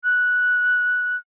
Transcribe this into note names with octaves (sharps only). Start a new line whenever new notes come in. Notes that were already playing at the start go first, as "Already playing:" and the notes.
F#6